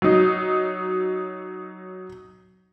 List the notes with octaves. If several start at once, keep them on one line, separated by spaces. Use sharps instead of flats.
F#3 D#4